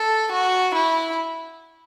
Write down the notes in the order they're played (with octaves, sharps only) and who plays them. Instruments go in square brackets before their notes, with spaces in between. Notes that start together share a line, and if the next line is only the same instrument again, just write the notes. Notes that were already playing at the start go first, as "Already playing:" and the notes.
Already playing: [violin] A4
F#4
E4